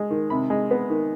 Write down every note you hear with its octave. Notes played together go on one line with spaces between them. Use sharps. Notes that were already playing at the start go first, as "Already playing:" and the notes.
Already playing: G#3
D#3
C3 B5
G#3
B3
D#3